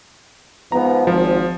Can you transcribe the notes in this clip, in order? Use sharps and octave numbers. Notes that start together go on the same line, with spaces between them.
G#2 F3 B3 A#5
G#1 F3